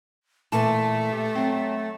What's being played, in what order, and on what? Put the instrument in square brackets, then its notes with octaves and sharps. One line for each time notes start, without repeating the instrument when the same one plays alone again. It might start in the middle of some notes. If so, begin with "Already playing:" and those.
[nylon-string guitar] A#2 E3 A5 [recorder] A3
[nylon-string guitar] G4
F#3 C4